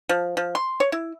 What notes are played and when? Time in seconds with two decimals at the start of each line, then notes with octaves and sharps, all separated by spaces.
0.09 F3
0.37 F3
0.55 C6
0.80 C#5
0.92 E4